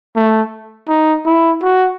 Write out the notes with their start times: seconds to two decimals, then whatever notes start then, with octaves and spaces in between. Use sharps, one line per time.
0.16 A3
0.88 D#4
1.26 E4
1.62 F#4